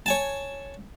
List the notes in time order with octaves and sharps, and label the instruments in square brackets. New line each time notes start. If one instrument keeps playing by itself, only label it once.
[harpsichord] C#5 G#5 A5